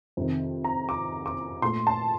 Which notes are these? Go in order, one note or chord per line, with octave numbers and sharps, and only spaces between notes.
F2 C3 D#3
A#5
D6
D6
A#2 A3 C6
A5